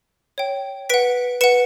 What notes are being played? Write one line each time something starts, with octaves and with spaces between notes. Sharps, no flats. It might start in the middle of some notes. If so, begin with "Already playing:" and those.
C#5 G5
B4 F#5 B6 D7
B4 F#5 C#7 E7